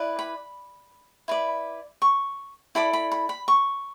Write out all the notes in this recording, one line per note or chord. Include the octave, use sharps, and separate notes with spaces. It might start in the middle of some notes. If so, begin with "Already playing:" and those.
Already playing: E4 B4 D5
B5
E4 B4 D5
C#6
E4 A4 D5 B5
B5
B5
B5
C#6